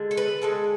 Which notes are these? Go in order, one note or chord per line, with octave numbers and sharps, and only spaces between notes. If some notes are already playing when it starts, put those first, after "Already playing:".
Already playing: D3 G#3
A4
B4
D3 G#3 A4